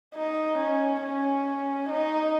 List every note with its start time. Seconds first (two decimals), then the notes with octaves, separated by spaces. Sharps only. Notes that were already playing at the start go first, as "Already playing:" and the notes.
0.15 D#4
0.59 C#4
1.02 C#4
1.89 D#4